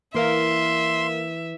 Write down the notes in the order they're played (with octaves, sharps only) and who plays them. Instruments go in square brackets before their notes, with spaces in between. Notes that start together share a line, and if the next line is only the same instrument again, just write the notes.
[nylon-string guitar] E3 [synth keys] A#3 A#4 F5 [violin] E5 [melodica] C6